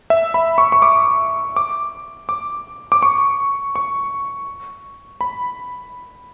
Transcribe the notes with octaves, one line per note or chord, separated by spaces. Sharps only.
E5
B5
C#6
C#6
D6
D6
D6
D6
C#6
C#6
B5